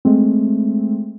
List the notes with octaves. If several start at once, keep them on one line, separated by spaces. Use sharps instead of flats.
G#3 A3 C4